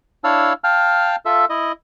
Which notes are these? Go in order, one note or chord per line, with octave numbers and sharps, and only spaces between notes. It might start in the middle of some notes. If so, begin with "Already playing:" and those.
D4 E4 C#5 F5 A5 E6
F5 G5 A5 F6
F4 A4 E5
E4 D#5